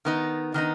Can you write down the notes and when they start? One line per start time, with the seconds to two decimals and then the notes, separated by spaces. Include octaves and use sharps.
0.05 D#3 B3 D#4
0.54 D#3 B3 D#4